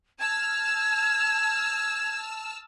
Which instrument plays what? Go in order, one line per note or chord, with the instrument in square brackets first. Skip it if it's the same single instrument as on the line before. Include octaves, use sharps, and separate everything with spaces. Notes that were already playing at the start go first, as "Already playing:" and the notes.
[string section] A5 E6 F6 [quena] G#6